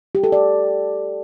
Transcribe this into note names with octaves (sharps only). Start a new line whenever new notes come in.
G4
A4
D5